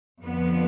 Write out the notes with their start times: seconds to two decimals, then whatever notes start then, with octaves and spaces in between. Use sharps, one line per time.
0.22 F2 D3 F3 B3